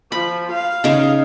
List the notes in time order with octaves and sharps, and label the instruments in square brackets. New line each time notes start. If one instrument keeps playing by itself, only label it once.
[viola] F3 [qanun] B5
[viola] F5
[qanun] C#3 D#4